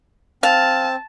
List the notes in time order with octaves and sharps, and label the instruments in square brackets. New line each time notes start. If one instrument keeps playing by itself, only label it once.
[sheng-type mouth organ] C4 [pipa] F5 [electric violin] A5